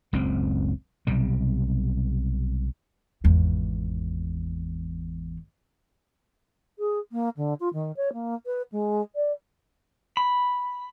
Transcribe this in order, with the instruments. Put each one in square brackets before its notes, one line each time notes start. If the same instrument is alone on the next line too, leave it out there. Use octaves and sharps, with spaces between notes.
[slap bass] F#1 C#2 A2 C4
B1 C3 G3
[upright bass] G#1 E2
[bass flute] G#4
A#3
D3
F4
D#3
C#5
A#3
B4
G#3
D5
[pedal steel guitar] B5